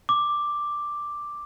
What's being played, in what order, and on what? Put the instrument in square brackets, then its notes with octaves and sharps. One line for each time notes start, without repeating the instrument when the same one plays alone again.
[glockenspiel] D6